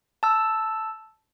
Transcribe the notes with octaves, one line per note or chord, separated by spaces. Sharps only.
A5 E6